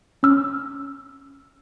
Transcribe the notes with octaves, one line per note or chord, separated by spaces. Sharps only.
C#4 E6 F6